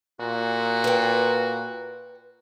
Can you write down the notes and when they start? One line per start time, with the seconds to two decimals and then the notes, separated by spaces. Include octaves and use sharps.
0.20 A#2 F#4
0.84 B4 G5